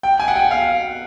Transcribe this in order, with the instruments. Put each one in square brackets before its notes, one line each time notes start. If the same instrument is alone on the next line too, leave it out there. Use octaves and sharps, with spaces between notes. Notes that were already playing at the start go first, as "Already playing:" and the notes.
[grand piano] G5
G#5
F#5
G5
F5